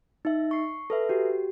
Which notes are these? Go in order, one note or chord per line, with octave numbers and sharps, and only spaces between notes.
D#4 E5
C#6 C7
A4 B4 E5
F#4 G4